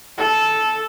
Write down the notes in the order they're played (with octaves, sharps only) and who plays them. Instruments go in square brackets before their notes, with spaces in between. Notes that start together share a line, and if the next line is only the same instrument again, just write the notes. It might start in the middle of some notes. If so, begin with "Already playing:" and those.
[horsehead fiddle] A4